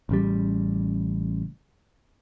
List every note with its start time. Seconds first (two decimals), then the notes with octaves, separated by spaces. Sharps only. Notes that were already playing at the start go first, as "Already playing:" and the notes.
0.09 A1 C#3 G3